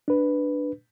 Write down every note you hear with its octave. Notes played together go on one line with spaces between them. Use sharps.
D4 B4